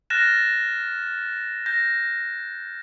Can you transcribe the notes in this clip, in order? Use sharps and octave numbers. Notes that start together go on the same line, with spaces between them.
F6 F#6 A6 A#6 E7
G6 A#6